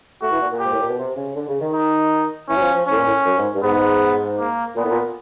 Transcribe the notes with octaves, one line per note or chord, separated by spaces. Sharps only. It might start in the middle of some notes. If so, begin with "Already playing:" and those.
A3 F#4
E3
A#2
A#2
G#2 G4
A2
A#2
B2
C3
C#3
D3
C#3
D#3
D#4
E3 C#4
F#3
F3
F3
A2 C#4
A#2
A2
F#2
G#2
G2
G#2 B3
A#3
A#2 B3
A2
A#2